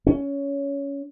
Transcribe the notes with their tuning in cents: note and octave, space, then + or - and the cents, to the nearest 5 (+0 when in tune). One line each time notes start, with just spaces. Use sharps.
C#4 +15